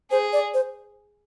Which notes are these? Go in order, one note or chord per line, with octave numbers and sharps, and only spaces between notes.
G#4 C5
D5
C5